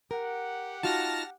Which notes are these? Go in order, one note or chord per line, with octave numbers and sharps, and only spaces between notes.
G4 A#4 F#5
D#4 F4 F#4 A5 F6 A#6